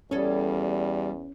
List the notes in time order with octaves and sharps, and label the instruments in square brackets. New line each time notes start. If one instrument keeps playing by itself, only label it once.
[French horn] E2 [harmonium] G3 [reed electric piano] C#4 [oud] G#4 A4